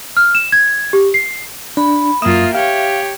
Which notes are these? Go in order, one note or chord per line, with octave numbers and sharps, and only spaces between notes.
F6
E7
G#6
G4
C7
D4 B5
F#2 A#3 F4 E5 D#6
G4 C#5 F5